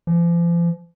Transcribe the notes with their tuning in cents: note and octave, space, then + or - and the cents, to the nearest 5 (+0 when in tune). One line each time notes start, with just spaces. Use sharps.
F3 -40